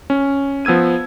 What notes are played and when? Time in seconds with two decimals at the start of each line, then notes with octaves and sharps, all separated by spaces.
0.10 C#4
0.65 F3 B3 E6 G#6 D#7